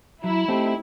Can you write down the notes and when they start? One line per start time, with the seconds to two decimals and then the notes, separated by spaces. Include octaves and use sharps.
0.24 F#3 E4
0.48 A3 C4 D#4 G4